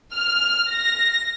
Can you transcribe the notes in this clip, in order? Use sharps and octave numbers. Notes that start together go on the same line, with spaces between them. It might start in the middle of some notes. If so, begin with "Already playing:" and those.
F6
A#6